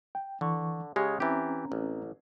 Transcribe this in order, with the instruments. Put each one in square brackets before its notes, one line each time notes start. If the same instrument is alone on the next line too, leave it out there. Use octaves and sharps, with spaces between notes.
[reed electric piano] G5
[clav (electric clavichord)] D3 [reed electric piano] E3 C#6
[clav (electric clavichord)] C#3 G#3 C#5 [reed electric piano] G4
[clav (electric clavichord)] E3 G4 [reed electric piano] C4 C#4 A#5
[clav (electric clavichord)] A1